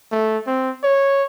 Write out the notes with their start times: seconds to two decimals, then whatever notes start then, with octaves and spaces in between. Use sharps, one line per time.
0.12 A3
0.47 C4
0.84 C#5